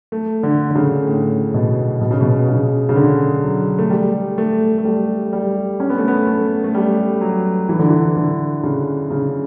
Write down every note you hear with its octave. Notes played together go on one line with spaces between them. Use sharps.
A3
D3
D3
C#3
A2
B2
B2
C#3
B2
C#3
C#3
D3
F#3
A3
G3
A3
A3
G3
G3
C#4
B3
A3
B3
A3
A3
G3
F#3
E3
D3
E3
D3
C#3
C#3